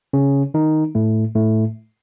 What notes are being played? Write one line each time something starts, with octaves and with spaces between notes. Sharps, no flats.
C#3 C#4
D#3 D#4
A2 A3
A2 A3